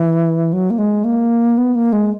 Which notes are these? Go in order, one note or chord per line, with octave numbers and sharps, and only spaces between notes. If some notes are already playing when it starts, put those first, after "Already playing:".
Already playing: E3
F#3
A#3
G#3
A#3
B3
A#3
G#3